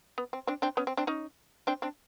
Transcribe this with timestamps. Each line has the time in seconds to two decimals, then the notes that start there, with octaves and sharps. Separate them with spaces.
0.18 B3
0.33 C4
0.47 C4 D4
0.62 C4 D4
0.77 B3 C#4
0.87 C4
0.97 C4 D4
1.07 C#4 D#4
1.67 C4 D4
1.82 C4 D4